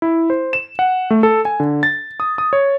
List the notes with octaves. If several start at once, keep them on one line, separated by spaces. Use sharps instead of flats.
E4
C5
E7
F#5
A3
A4
G#5
D3
A6
D#6
D#6
C#5